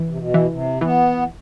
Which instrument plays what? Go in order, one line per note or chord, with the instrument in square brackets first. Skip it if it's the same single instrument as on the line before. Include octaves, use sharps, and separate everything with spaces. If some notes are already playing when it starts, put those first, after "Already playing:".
Already playing: [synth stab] E3
[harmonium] C3
B2
[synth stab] E3
[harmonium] C3
[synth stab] E3 [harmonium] B3